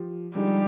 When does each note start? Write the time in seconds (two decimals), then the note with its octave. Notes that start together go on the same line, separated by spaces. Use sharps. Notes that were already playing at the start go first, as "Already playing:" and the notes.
Already playing: F3 G4
0.35 D3 F3 G3 G#3 D#4 G4